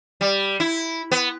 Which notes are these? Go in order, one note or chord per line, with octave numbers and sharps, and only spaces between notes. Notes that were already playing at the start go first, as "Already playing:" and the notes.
G3
E4
B3